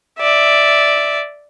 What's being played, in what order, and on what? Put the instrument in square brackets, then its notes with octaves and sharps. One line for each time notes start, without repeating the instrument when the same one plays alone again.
[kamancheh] D5 E5